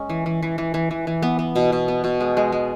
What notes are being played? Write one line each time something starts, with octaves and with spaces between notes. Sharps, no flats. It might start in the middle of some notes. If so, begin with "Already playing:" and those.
Already playing: G#3 C#4
E3
E3
E3
E3
E3
E3
E3
B3
B3
B2
B2
B3
B2
G#3
G#3
G#3